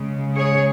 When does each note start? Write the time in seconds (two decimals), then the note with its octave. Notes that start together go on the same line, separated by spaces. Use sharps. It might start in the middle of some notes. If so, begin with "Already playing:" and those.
Already playing: C#3 G#3
0.36 G#4 C#5